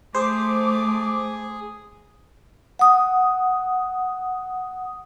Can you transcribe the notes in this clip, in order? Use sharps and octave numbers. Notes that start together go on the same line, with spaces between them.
A3 G#4 C5 D6
F#5 D#6